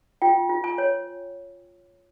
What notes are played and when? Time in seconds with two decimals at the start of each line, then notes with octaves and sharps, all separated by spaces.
0.22 F4 G5
0.49 F4
0.64 G#5
0.78 C#5